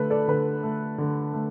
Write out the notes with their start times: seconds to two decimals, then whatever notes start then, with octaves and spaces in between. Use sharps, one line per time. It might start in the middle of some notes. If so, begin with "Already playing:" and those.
Already playing: D3 A3 A4 B4
0.10 A4 D5
0.28 D3 B4
0.63 A3
0.98 D3
1.34 A3